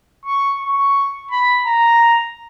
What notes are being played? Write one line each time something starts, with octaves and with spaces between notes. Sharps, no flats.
C#6
C#6
B5
A#5